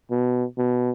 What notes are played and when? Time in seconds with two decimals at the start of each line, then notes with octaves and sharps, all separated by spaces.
0.11 B2
0.58 B2